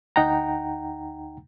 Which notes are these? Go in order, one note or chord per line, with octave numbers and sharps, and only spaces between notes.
D2 D#4 F#5 G5 A#5